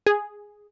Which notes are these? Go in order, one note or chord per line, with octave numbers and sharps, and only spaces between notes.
G#4